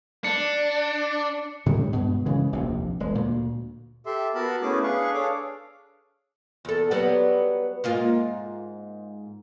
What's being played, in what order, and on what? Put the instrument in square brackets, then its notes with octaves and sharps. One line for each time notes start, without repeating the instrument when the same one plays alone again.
[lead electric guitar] D4 [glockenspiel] C#7
[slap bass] A2 D3 G3 G#3
G2 B2 G#3
C#3 E3 G#3
F1 A#1 D#2 C3
E1 G#3
D2 A#2
[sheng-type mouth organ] G4 A4 E5 C6
B3 F#4 A#4 A5 B5
A3 B3 C#4 E4 G#4 D6
D4 G#4 B4 F5 C#6
D4 G#4 A4 C#5 F5 D6
[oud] E2 A4
F#3 G3 B3
G#2 A#3 F4